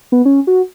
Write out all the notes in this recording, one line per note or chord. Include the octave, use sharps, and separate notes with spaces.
B3
C#4
F#4